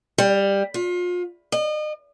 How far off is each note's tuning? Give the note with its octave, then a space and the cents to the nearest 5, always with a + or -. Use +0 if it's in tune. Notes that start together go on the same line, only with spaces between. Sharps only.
G3 +15
F4 +35
D#5 -35